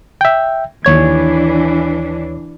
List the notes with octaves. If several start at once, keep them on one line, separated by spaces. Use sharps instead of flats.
E5 G5
D#2 E3 D4 C#5 G#6